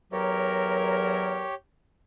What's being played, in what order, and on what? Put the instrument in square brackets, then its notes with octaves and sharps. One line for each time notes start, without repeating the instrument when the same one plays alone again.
[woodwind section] E2 F#3 A#4 [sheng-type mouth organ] G4 C#5